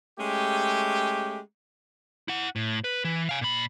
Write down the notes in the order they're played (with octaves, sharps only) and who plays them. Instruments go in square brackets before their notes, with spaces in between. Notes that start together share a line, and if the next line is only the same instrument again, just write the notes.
[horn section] G#3 A3 C#4 G4
[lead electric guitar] E4 F#5
A2
B4
E3
F5 G#5
A#2 B5